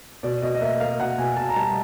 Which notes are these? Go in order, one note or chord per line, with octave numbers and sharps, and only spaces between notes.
B2 D5
B2 D#5
D#5
A#3 E5
A#3 F5
B2 F#5
B2 G#5
B2 A5
A#5
G3 A5